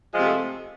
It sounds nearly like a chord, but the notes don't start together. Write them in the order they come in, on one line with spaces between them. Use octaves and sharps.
G#3 F3 C3 A3